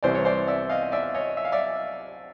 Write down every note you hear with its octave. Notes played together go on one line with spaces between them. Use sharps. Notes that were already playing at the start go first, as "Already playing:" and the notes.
C2 C3 E3 C5 D5
C#5
C5 D5
D5 E5
D#5 F5
D5 E5
C#5 D#5
E5
F5
D5 E5